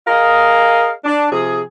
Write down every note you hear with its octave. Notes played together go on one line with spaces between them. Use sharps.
G#4 A#4 D#5 F5
D4
C3 F3 G#4